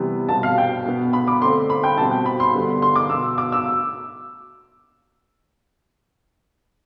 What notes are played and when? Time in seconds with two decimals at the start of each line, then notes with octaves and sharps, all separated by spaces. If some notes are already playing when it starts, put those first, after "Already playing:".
Already playing: C3 E3 G3 B3
0.29 B2 G3 C4 A5
0.43 F5
0.58 G5
0.86 B2 B3
1.13 B5
1.27 D6
1.41 D3 A3 C4 C6
1.70 B5
1.84 G5
1.97 B2 G3 C4 A5
2.11 G5
2.26 B5
2.40 C6
2.54 D3 G3 B3
2.82 C6
2.96 D6
3.10 B2 B3 E6
3.38 D6
3.52 E6